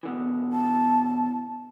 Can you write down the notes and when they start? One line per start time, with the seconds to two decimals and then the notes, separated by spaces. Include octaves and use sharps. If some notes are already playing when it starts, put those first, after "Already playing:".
0.03 B2 D3 E3
0.53 A5